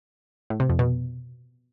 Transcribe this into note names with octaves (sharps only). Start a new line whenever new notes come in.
A2
C3
F2
B2